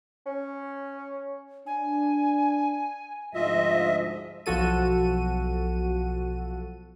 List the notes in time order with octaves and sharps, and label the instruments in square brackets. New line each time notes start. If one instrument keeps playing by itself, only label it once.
[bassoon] C#4
[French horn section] D4 [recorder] G#5
[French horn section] D2 G#2 F3 [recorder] F4 [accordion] D#5 E5
[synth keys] B1 F3 F#4 A4 D#7